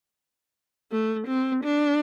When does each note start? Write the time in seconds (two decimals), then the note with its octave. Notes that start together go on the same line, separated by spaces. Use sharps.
0.91 A3
1.27 C4
1.64 D4